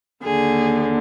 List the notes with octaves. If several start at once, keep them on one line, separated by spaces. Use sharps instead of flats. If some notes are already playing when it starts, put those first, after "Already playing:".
D#2 D3 G#4